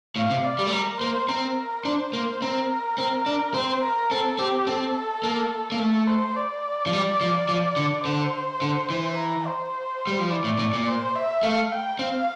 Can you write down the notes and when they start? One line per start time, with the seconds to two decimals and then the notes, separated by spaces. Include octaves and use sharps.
0.16 A2 F5
0.30 C3
0.45 D5
0.59 G3
0.67 A3
0.72 G3 A#4
1.01 A#3 C5
1.29 C4 A#4
1.85 D4 C5
2.13 A#3 C5
2.42 C4 A#4
2.98 C4
3.26 D4
3.54 C4 C5
3.83 A#4
4.11 C4 A4
4.39 C4 G4
4.67 C4 A4
5.23 A#3
5.72 A#3
5.79 A3 A4
6.07 C5
6.36 D5
6.87 F3
6.93 G3
7.21 F3
7.49 F3
7.77 D3
8.05 D3 C5
8.62 D3
8.90 E3
9.17 A#5
9.46 C5
10.07 G3
10.19 F3
10.30 E3 D5
10.44 A2
10.59 A2
10.73 A#2
10.88 C5
11.16 E5
11.43 A3 F5
11.71 G5
11.99 C4 F5